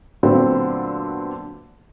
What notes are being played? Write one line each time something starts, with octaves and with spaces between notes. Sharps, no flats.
A#2 D3 F#3 A3 B3 C4